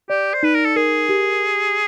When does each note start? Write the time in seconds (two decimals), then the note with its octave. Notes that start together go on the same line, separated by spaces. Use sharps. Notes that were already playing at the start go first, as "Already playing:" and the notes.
0.09 G4 D5
0.34 C5
0.43 D#4 B4
0.55 A#4
0.65 A4
0.76 G#4 A#4
1.09 G4